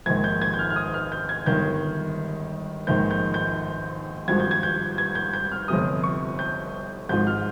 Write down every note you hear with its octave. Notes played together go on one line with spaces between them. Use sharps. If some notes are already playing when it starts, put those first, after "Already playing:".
A#1 G#2 D#3 G#6
G6
G#6
G6
F6
F6
D#6
F6
G6
G#6
G1 G2 D#3 G6
A#1 G#2 D#3 G6
G6
G6
G#1 G2 F3 G#6
G6
G#6
G6
G#6
G6
G6
F6
G1 F2 C3 D#6
C#6
G6
G#1 G#2 F3 G6
F6